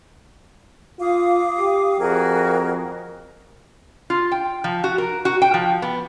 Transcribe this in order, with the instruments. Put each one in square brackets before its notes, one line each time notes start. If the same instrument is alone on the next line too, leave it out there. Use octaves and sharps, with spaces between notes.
[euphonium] F4 [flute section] F5 D6 D#6
[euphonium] G4
[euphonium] F2 [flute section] F#4 G#4 A#4
[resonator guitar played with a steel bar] F4
G5
F3
F#4
A#4
F#4
G5
F3
B3